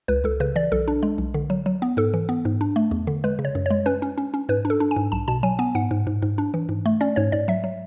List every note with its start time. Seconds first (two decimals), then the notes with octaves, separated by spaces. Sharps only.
0.08 C#2 B4
0.24 C#2 A4
0.40 C#3 B4
0.56 E3 D5
0.72 B1 A4
0.88 D4
1.03 G#3
1.18 B1
1.34 D3
1.50 F#3
1.66 F#3
1.82 B3
1.97 G#2 A4
2.14 E3
2.29 B3
2.45 G#2
2.61 D4
2.76 A3
2.91 E2
3.07 D3
3.24 G#3 B4
3.39 C#3
3.45 C#5
3.55 F#2
3.66 G#3 C#5
3.86 C#4 B4
4.02 C#4
4.18 C#4
4.34 C#4
4.49 G#2 B4
4.65 D4
4.70 A4
4.80 D4
4.91 G#5
4.96 G#2
5.12 B1 A5
5.28 B2 A5
5.43 F#3 G#5
5.59 B3 G#5
5.75 G#2 F#5
5.91 G#2
6.07 G#2
6.22 G#2
6.38 D4
6.54 E3
6.69 G#2
6.86 A3
7.01 C#4 D5
7.16 G#2 C#5
7.32 G#2 D5
7.48 F#3 E5
7.64 F#3